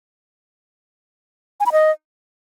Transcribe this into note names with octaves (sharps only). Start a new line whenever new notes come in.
G#5
B5
D#5